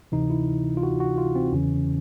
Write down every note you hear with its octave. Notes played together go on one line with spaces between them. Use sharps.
D2 C3 E3 D#4
E4
F4
F#4
F#4
F4
C4
E2 C#3 E3 C#4